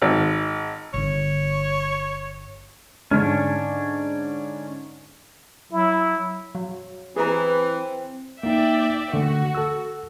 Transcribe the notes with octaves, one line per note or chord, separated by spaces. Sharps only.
G#1
G1 D3 C#5
G#2 D3 C#4 D4 C#5
F#3 E4
F#3
E3 C4 G#4 A#5
A#3 D#4 D5 E5 G5
D3 A3 F#4
A4 E6